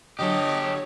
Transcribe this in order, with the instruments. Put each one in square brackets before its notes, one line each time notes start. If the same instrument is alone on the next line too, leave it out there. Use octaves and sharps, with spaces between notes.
[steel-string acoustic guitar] D3 F#3 F#4 [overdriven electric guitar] G4 A4 [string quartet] C#5 [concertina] D#5